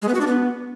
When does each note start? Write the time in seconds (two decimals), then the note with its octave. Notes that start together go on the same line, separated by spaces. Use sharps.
0.02 G#3
0.08 B3
0.15 F#4
0.21 D4
0.27 B3